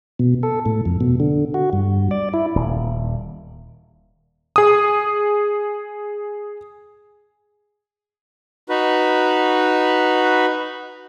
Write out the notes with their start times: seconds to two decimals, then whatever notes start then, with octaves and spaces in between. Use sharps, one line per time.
0.19 B2
0.43 A4
0.66 A2
0.85 F2
1.01 B2
1.20 D3
1.54 F#4
1.73 G2
2.11 D5
2.34 E4
2.56 D#1
4.56 G#4 D#6
8.69 D#4 F#4 B4